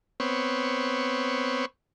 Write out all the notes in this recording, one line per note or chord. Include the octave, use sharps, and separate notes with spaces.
B3 C4 C#5